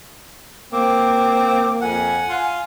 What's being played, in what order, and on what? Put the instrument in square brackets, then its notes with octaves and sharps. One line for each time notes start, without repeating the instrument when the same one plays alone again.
[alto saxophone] A#3 [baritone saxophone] C4 [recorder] D6
[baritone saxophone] F2 [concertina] F#5 [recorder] G#5
[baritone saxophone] F4